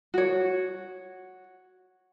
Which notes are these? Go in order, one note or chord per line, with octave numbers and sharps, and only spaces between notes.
F#4 C#5